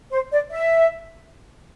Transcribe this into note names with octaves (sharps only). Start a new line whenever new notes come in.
C5
D5
E5